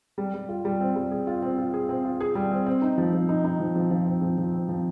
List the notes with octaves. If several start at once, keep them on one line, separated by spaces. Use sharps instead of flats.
G3
G3
F4
G3
C4
G3
G#4
F4
C4
F4
G#4
C4
F4
G#4
G3
C4
C4
D#4
F3
F3
D#4
D#4
F3
F3
F3
C4
F3
F3
C4
F3